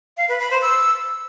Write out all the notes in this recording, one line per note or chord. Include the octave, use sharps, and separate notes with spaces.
F5
B4
B5
C5
E6